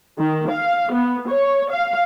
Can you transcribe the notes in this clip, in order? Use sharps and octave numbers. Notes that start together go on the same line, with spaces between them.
D#3
F5
B3
C#5
F5